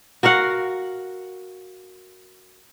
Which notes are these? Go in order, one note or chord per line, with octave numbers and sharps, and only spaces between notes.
F#4 A#4 F5 F#5